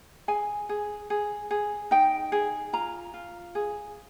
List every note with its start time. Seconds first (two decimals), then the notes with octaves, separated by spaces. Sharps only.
0.28 G#4 G#5
0.69 G#4
1.10 G#4
1.51 G#4
1.91 D#4 G5
2.32 G#4
2.73 F4 A#5
3.14 F4
3.55 G#4